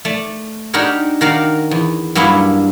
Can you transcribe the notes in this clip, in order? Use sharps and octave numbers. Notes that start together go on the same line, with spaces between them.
A3 D5
D4 D#4 F#4 G4 A#4 C#5
D#3 F#4 A#4 D5 F5
E2
G2 F#3 A#3 C#4 D4 E4